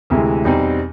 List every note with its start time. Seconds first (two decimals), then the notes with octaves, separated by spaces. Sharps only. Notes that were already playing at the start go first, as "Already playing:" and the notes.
0.10 D2 C3 E3 G#3
0.45 E2 B2 G3 C4 D#4